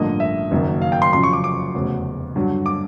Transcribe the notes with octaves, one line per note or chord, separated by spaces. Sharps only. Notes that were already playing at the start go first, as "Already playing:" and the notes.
Already playing: A1 G2 D3 F3 A#3 D#5
E5
F#1 F#2 D#3 F#3 A#3
F5
G5
C6
F#2 C#3 F3 C6
C#6
D6
D6
F1 E2 C#3 F#3
G2 D3 F#3
D6